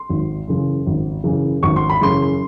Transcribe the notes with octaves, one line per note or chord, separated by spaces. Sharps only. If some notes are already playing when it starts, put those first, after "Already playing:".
Already playing: C6
G#1
F#2 C#3 E3
G#1
F#2 C#3 E3
G#1 C#6
C6
B5
F#2 C#3 E3 C6